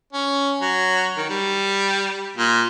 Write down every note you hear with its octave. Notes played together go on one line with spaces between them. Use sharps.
C#4
F#3
D#3
G3
A#2